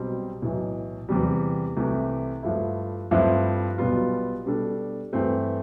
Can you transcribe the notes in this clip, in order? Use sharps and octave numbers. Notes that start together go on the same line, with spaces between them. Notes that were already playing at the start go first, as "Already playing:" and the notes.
Already playing: B1 B2 G3 C4
B1 A2 E3
E2 C3 G3
C2 C3 E3 A3
G2 F3 A3 E4
G2 F3 A3 C4 E4
B1 B2 G3 B3 F4
B2 G3 D4 A4
G2 E3 A3 C4